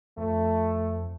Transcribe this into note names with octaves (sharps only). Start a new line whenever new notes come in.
F2 A3